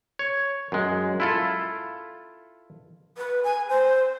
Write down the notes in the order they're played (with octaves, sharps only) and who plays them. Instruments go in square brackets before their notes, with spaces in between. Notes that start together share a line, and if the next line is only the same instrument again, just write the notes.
[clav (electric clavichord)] C#5
F#2 G#3
E4 F4 A4
[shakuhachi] B4
G#5
C5